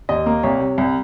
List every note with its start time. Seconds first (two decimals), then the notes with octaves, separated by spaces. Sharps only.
0.09 D#2 D#5
0.26 A#3
0.43 C2 C#5
0.60 C3
0.78 C2